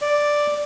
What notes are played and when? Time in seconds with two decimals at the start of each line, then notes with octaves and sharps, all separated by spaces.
0.01 D5